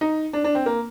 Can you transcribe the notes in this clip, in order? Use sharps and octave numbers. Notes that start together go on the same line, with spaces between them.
D#4
D4
D4
C4
A#3